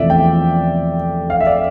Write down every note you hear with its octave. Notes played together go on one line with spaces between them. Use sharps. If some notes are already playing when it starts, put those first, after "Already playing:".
Already playing: E2 C3 F3 A3 D5 E5
G5
F5
E5
D5